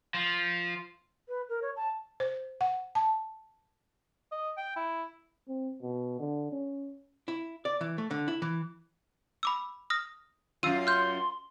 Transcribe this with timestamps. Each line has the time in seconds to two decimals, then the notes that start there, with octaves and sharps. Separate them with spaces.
0.14 F3
1.29 B4
1.49 A#4
1.62 C#5
1.76 A5
2.20 C5
2.61 F#5
2.95 A5
4.31 D#5
4.57 G5
4.76 E4
5.48 C4
5.82 B2
6.20 D3
6.52 C#4
7.28 E4
7.65 D5
7.81 E3
7.98 A3
8.11 D3
8.28 E4
8.42 E3
9.43 B5 D6 E6
9.90 D#6 F6 A#6
10.63 F#2 F4 E6 D#7
10.87 C6 F6 G6